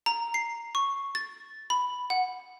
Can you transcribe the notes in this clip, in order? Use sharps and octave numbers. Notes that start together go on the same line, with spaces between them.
A#5
C7
C#6
A6
B5
F#5